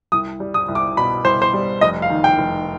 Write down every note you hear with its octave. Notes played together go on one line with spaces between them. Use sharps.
C2 D#6
G3
D#6
C2
D6
B2 B5
C2 C5
C5
G3
F1 D#5
F5
D#3
G5
F1